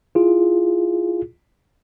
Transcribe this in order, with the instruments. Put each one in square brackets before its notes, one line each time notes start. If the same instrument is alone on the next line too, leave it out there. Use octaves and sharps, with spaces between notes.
[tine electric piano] E4 F4 G#4